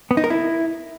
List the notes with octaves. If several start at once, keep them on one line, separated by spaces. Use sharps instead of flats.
B3
D#4
A#4
E4